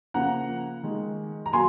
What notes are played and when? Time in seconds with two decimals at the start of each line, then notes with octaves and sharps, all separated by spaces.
0.14 C#3 F3 A#3 F#5 A#5
0.83 D#3 G#3
1.46 A#5
1.53 F#3 A#3 G#5 C6